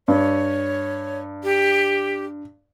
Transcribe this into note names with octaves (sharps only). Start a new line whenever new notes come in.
G2 C#5
G4